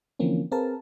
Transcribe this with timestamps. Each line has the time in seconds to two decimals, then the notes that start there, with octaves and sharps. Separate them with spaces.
0.19 D3 E3 F3 A#3 C4 C#4
0.52 C4 G#4 A#4 B4 F5 A5